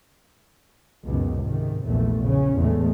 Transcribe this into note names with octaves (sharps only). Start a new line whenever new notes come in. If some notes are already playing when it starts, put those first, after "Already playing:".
C#2 F#2 B2 D#3
G#2 C3 D#3
A#1 E2 A3
C#3 C#4
E2 A2 E3 G#3 A3